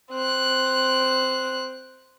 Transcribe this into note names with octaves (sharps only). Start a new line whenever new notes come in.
C4 F#6